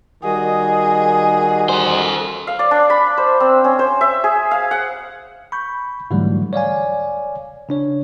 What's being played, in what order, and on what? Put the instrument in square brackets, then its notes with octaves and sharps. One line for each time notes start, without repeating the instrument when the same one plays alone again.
[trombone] D#3 [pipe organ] G3 F#4 D#5 [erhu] G#4
[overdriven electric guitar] A4 C5
[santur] F5
D5
D4
B5
C5
C4
C#4
C5
E5
G#4
F5
F#5
[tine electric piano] B5 C#6 G6
G#2 D3 E3 F#3 G3 A3
C#5 D5 F5 G#5
C#3 D4 C#5